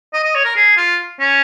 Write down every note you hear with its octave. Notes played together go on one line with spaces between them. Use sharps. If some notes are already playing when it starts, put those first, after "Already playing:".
D#5
D#5
C#5
A#4
G#4
F4
C#4